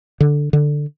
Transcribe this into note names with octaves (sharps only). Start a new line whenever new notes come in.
D3
D3